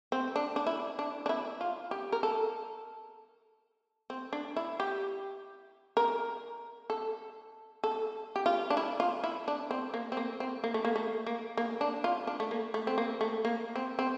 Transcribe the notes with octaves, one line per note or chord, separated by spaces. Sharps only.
C4
D4
D4
E4
D4
D4
E4
F4
G4
A#4
A4
C4
D4
E4
G4
A#4
A4
A4
G4
F4
D4
E4
F4
E4
D4
C4
A#3
C4
A#3
C4
A#3
A3
A#3
A3
A#3
A#3
D4
F4
D4
A3
A#3
A3
C4
A#3
A3
A#3
C4
C4